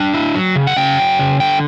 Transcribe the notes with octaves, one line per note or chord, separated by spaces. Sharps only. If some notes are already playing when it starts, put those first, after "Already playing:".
Already playing: D4 G5
E4
F#3
C#3
F#5
C#3 G5
F#3
C#3
D3 G5